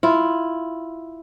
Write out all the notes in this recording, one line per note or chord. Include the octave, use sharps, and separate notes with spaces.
E4 F4